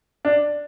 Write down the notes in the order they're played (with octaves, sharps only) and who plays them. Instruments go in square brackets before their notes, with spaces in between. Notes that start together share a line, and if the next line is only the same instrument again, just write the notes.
[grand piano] D4